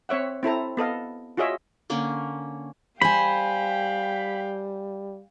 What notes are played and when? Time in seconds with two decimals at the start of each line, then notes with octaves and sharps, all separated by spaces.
0.09 C4 C#5 E5 F#5
0.43 C4 E4 A4 A#5
0.77 B3 A4 D#5 F5
1.37 F4 F#4 G#4 C#5 D#5 E5
1.90 D3 A#3 C#4
3.01 G3 C5 F5 G5 G#5 B5